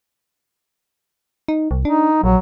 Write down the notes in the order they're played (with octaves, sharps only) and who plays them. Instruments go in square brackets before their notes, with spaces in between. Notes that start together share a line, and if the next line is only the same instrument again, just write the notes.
[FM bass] D#4
C2
[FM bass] D4 [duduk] D#4
[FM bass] A#1 [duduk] F#3